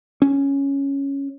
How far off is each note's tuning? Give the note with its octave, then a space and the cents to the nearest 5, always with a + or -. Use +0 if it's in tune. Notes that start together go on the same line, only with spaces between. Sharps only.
C#4 +0